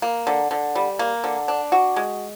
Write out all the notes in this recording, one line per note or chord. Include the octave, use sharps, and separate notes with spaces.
A#3
D3
D3
G3
A#3
D3
D4
F#4
G#3